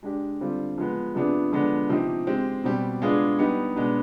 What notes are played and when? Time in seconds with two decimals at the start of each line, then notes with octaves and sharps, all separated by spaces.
0.03 G#3 D4 G4
0.41 D3 G3 C4 F4
0.78 F3 G#3 B3
1.15 C3 F3 B3 D4 G#4
1.52 D3 F3 G#3 B3 D4
1.89 C3 F3 C4 D#4 G4
2.27 G#3 C4 G4
2.64 B2 G3 C4 G4
3.02 G#3 B3 D4 F4 G#4
3.39 G3 B3 D#4 G4
3.76 B2 G#3 B3 D4